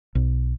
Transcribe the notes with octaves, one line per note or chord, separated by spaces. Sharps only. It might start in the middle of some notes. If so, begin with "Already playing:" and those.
B1